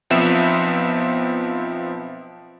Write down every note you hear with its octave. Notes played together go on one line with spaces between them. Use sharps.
B1 F3 B3 C4 E5 E7